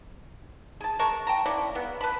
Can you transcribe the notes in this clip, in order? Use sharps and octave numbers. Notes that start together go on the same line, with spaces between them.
G#4 A5
G#3 A#4 A5 C#6
G5 A5 A#5
A#3 C#4 E4 D5
C#3 B3
B4 A5 B5